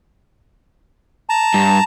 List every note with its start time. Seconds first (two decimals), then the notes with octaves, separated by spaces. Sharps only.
1.29 A5 A#5
1.54 G2